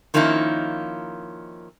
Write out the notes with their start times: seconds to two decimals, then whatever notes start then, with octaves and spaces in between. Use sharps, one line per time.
0.14 D#3 F3 A#3 C#4 D#4 E4